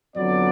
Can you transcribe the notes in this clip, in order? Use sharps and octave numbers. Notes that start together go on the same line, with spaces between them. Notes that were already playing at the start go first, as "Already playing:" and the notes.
F2 D3 F#3 B3 D5